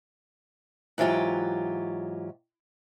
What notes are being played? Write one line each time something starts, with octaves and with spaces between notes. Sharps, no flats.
G#2 E3 F#3 F4 G4